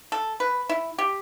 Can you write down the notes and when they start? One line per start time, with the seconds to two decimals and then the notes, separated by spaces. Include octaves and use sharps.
0.12 A4
0.40 B4
0.69 E4
0.98 G4